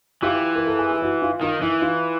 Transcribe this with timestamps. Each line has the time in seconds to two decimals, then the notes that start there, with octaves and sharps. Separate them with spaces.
0.22 E3 F4 G4
0.56 A#4
0.67 A4
0.79 G#4
0.91 G4
1.02 E4 F#4
1.22 F4
1.41 D#3 F4
1.62 E3 E4
1.82 F4